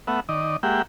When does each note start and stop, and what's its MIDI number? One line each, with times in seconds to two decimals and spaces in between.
0.07 0.20 57
0.07 0.20 59
0.07 0.20 76
0.07 0.20 78
0.29 0.57 51
0.29 0.57 74
0.29 0.57 75
0.63 0.82 56
0.63 0.82 58
0.63 0.82 67
0.63 0.82 76
0.63 0.82 78
0.63 0.82 79